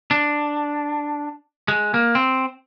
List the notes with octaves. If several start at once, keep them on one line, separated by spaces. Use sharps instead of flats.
D4
G#3
A#3
C4